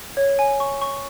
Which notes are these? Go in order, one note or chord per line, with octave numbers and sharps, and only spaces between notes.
C#5
G#5
C#6
C#6